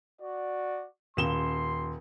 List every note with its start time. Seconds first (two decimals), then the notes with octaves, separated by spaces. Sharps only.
0.22 F#4 D5
1.17 D#1 C6 E7 G7